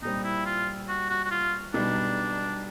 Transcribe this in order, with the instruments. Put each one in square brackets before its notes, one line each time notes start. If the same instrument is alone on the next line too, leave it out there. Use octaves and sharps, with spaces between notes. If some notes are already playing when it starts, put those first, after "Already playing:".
[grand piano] A#2 G3 C4 [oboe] D#4
[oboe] E4
F4
F#4
F#4
F#4
F4
[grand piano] B1 B2 G3 B3 D#4 [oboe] D4